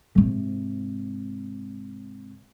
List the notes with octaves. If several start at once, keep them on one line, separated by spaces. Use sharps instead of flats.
G#2 C3